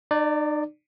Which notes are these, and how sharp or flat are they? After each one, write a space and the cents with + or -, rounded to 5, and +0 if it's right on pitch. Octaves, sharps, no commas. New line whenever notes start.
D#4 -45 D5 +0